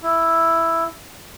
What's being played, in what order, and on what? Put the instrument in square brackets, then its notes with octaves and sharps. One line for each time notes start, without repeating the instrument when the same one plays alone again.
[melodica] E4